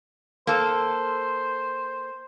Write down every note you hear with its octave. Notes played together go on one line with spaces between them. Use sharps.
A#3 A4 C5